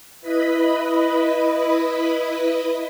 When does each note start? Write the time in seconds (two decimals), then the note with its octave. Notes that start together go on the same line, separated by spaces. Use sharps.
0.21 E4 B4 D#5 B5